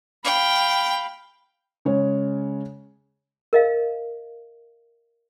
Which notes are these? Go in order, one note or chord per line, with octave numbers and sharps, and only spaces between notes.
F5 G5 B5
C#3 G#3 C#5
A#4 D#5 F5